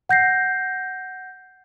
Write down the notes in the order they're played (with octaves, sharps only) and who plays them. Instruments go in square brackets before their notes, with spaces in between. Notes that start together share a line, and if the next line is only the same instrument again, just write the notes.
[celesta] F#5 G6 A#6 C7